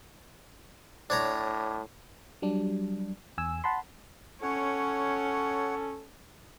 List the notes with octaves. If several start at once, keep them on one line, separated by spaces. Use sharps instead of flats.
A2 D4 C#5 A#5
F#3 G3 D4
E2 G#5 E6
F#5 A5 B5 C6
C#4 A4 C#5 F#5